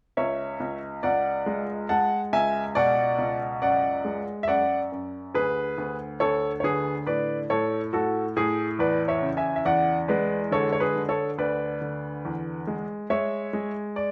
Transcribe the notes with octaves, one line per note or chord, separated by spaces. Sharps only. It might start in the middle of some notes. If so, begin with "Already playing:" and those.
C#2 C#5 E5
C#2
C#2 D5 F#5
G#3
G#3 F#5 A5
C#2 E5 G#5
B2 D5 F#5
C#2
F#2 D5 F#5
G#3
E5
F#2 D5 F#5
F#2
D2 G#4 B4
D2
D2 A4 C#5
C#5
D3 G#4 B4
A2 B4 D5
A2 A4 C#5
A2 F#4 A4
A2 G#4
E2 B4 D5
C#5 E5
C#3
E5 G#5
E5
E2 D5 F#5
G#3 B4 D5
D3 A4 C#5
C#5
G#4 B4
D3
A4 C#5
D2 B4 D5
D3
E2
G#3
G#3 C#5 E5
G#3
D5